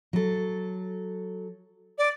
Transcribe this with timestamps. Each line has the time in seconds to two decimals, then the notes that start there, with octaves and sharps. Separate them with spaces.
0.13 F#3 A4
1.98 D5